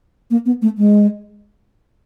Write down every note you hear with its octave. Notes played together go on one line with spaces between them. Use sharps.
A#3
B3
A3
G#3